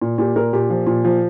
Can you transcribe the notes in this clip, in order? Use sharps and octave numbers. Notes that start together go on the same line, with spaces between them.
A#2
A#2 G4
A#2 A#4
A#2 G4
F3
A#2
F3